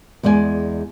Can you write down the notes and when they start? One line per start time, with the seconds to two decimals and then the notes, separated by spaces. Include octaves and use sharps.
0.23 E2 G#3 D5 F5 G#5